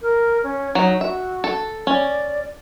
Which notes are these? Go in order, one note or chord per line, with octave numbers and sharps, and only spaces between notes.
A#4
C#4
F#3 D#4
F#4 E5
A4
C#4 D5